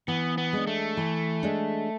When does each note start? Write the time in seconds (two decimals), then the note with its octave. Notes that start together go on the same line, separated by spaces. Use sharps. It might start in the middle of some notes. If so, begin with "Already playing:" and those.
0.08 E3 B3
0.38 B3
0.53 G#3 D4
0.67 A3
0.97 E3
1.43 G#3 D4